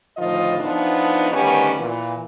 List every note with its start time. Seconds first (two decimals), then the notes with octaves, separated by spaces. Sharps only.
0.18 D2 A2 D#3 F3 F4 D#5
0.60 E3 F3 B3 D4 D#4
1.32 D2 D#3 G3 B3 C#4
1.78 A#2 E3